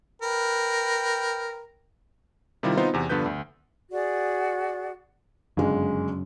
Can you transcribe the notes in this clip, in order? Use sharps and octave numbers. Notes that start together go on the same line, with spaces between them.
A#4 B4 G5
C3 D#3 G3 E4 F4
B3 C4 D#4 F4 C5
E2 C3
G2 D3 F3 B3 B4 G6
D2
F#4 G#4 D5
G1 F#2 C#3 G#3